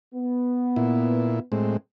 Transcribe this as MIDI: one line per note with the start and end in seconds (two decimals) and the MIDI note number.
0.15 1.45 59
0.76 1.40 46
0.76 1.40 64
1.52 1.77 45
1.52 1.77 56
1.52 1.77 60